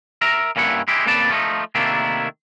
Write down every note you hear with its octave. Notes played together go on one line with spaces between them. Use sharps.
A#4 E5 A#5
G2 A#3 C#4 E4 F#5
G#3 E4 G4
C#3 A#3 C4 B4 D5 A5
F3 A3 C#4 D#4
C3 D#3 A3 A#3 D4 E4